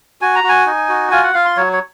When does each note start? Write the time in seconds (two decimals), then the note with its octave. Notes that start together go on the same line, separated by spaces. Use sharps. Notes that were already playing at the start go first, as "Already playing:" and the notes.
0.22 F#4 G#5
0.35 A#5
0.44 F#4
0.49 G#5
0.66 D#4
0.89 F#4
1.11 F4 G#5
1.23 F#5
1.34 F4 F5
1.45 C6
1.57 F#3 C#5
1.73 C#5